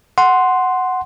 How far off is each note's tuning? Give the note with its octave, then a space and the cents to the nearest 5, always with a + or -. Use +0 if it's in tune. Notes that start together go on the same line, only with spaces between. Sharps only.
F#5 +0 C6 +0